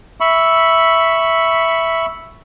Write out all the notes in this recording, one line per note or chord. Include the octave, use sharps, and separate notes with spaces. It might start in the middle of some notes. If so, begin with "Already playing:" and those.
E5 B5 C#6